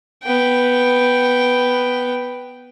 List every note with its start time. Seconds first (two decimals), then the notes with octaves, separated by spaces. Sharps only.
0.23 B3 G5